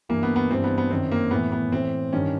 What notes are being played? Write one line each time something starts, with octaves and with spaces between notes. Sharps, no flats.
G2 E3 A#3
B3
B3
G2 E3 C4
B3
B3
F#2 D#3 C4
A#3
A2 E3 B3
B3
A2 E3 C4
G2 D#3 C#4